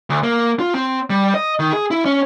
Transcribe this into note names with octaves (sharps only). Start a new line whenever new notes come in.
D2
A#3
F4
C4
G3
D#5
D#3
G#4
E4
C#4